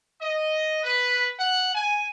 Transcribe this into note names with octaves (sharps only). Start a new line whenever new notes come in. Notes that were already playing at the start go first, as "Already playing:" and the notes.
D#5
B4
F#5
G#5